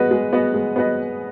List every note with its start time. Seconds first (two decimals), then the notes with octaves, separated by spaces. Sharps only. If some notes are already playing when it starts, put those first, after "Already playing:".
Already playing: G#3 B3 F#4 B4 D#5
0.11 G#3
0.33 B3 F#4 B4 D#5
0.54 G#3
0.76 B3 F#4 B4 D#5